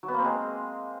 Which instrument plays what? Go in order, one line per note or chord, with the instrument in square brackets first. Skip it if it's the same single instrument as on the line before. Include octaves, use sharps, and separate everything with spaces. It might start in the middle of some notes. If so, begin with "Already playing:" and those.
[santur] F#3
B3
A#3
C4
G#3